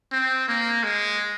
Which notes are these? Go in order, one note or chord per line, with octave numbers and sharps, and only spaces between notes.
C4
A#3
G#3